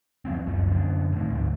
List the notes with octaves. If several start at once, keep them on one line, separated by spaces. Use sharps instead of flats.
E2 F3 B3 C4
F#1 C#2 F#2 F3
F#2 D3
A2 D#3
D2 G#2